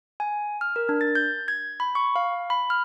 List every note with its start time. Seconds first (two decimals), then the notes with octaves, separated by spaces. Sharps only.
0.20 G#5
0.61 F6
0.76 A#4
0.89 D4
1.01 A6
1.15 G6
1.48 G#6
1.80 B5
1.95 C#6
2.16 F5
2.50 B5
2.70 F6